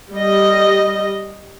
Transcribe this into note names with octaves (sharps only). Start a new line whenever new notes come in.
G3 D#5